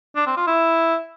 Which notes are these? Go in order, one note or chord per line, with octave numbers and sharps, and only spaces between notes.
D4
C4
F4
E4